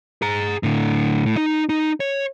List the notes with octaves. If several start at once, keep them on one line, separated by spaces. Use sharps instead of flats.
G#4 A#5
A2 D3
A2
D#4
D#4
C#5